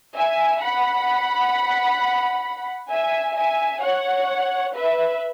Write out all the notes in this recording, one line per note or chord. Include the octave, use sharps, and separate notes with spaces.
E5 G#5
F#5 B5
E5 G#5
E5 G#5
C#5 F#5
B4 E5